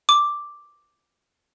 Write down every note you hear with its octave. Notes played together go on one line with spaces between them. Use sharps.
D6